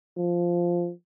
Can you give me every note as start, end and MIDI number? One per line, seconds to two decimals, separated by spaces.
0.17 0.91 53